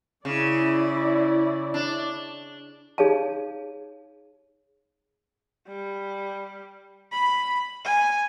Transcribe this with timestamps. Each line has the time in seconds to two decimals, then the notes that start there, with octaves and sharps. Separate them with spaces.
0.25 C#3 E4 D5
1.74 D4
2.98 D#4 G#4 C#5 F5 A5
5.68 G3
7.12 B5
7.85 G#5